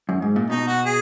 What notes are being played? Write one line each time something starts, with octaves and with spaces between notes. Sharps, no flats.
F#2
G#2
A#2
B2 D#4
F#4
G#4